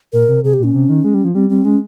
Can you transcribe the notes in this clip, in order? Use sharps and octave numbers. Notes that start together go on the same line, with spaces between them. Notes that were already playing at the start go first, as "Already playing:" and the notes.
A#2 A#4
C3
C3 G#4
G4
A#2 C#4
C3
D#3
G#3
G3
F3
G3 C4
G3 C4
G#3 C#4